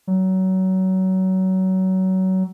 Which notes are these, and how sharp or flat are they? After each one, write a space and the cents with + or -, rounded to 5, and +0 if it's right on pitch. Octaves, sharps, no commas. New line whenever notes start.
F#3 +25